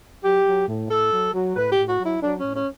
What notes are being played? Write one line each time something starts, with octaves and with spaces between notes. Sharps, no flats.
F#3 G4
F#3
A2
A2 A4
F#3
F#3
A2 B4
G4
A2
F#4
F#3
E4
F#3 D4
C#4
A2
C#4